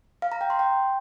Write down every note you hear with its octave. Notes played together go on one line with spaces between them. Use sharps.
F5
A#5
G5
C6
G5